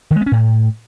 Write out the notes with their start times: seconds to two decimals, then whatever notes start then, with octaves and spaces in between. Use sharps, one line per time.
0.11 D#3
0.16 G#3
0.21 B3
0.26 C#4
0.32 A2